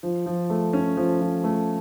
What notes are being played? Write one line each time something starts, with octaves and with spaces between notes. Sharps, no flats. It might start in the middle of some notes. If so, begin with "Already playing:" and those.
F3
F3
A3
C#4
F3
F3
A3